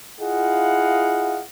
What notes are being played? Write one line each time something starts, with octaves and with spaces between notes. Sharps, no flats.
E4 F4 G#4 D#5 F5 F#5